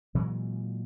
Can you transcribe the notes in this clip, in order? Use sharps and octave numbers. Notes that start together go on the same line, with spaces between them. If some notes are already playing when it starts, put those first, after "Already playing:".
A#2 E3 F#3 G#3